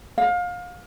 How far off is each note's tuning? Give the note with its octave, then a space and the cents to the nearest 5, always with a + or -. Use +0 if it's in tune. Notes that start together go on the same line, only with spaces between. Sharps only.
F5 +30